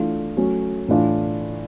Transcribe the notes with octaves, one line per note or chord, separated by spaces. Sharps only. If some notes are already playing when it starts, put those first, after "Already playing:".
Already playing: E3 A3 D4 F4
F#3 A3 C#4
A2 E3 A3 D4 F4